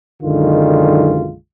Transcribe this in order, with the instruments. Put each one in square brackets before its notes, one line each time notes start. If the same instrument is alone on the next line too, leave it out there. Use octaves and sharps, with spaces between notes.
[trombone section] B1 F#2 D3 D#3 G#3 F4